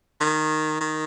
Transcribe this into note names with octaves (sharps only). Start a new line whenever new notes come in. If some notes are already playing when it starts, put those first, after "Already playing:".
D#3
D#3